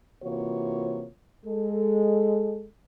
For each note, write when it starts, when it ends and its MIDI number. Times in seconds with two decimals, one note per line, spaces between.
0.23 1.06 48
0.23 1.06 52
0.23 1.06 58
0.23 1.06 65
0.23 1.06 66
0.23 1.06 73
1.46 2.66 56
1.46 2.66 69